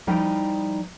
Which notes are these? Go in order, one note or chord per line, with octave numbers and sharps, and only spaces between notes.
F3 G3 D#4 E4 G5